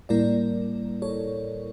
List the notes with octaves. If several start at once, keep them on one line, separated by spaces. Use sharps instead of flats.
A2 G3 A#3 E4 A#4 D5
A4 C#5